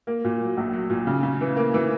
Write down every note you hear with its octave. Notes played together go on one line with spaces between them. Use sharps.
A#3
A#2
F#3
A#1
F#3
A#2
C#3
C#3
E3
A#3
E3